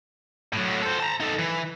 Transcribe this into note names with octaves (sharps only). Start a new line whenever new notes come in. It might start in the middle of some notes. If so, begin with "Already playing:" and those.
A2 F#3
A4 C5
A5 A#5
D#4 A4
E3